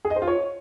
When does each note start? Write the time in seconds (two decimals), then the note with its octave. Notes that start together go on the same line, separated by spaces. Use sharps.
0.05 G#4
0.10 D#5
0.16 C5
0.22 F4
0.28 C#5